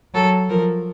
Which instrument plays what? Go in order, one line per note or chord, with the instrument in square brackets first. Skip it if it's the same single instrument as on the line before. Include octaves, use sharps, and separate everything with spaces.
[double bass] F#3 [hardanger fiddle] A4
[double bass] F3 [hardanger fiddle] A#4